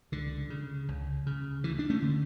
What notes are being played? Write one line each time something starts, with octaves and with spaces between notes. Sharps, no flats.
C#2 D3
C#3
C#2
C#3
D2 E3
D4
A3 C#4
D3